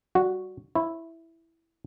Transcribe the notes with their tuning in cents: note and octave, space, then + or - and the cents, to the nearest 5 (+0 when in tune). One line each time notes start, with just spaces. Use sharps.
G3 -20 F#4 -5
E4 +0 C#5 -45